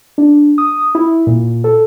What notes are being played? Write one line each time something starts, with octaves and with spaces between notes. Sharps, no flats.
D4
D#6
E4
A#2
A4